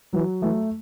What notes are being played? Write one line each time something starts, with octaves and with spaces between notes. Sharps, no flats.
E3 F#3
E3 A3